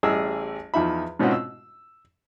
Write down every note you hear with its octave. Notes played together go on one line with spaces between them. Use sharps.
A1 G3 G#4 D#5 E6
E2 F3 D#4 E5 B5
G#2 B2 C4 C#4 F4 F#4
E6